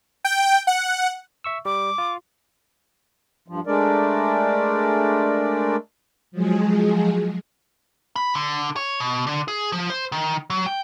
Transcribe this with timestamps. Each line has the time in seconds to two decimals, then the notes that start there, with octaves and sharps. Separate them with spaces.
0.24 G5
0.67 F#5
1.44 E5 C#6 E6
1.65 G3 D6
1.98 F4
3.48 G2 F3
3.67 G#3 A3 D4 A#4 D5
6.32 F3 F#3 G#3 G#4
8.16 B5
8.35 D3
8.76 C#5
9.00 B2
9.27 D3
9.48 G#4
9.72 F3
9.90 C5
10.12 D#3
10.50 F#3
10.66 G5